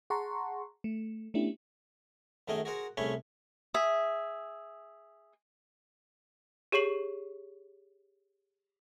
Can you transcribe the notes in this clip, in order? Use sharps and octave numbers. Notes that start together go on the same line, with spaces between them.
G#4 F#5 A5 A#5 C6 C#6
A3
A3 B3 C#4 D4 E4 G4
F#2 D#3 A3 G#4 A#4 D#5
F#4 G#4 A#4 C5 F#5
C2 A3 C#4 G#4 C#5 B5
G#4 E5
G4 G#4 C#5 C#6 C7 F#7